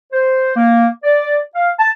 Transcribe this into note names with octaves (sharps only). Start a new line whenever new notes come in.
C5
A#3
D5
F5
A5